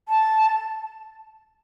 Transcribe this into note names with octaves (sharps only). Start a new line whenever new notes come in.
A5